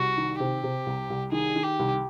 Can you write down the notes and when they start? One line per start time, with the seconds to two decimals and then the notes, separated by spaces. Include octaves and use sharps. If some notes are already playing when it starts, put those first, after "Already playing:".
Already playing: C2 F#4
0.17 D#3
0.40 C3 G4
0.64 C3
0.86 C2
1.10 C2
1.32 D#3 G#4
1.56 D#3
1.63 G4
1.79 C2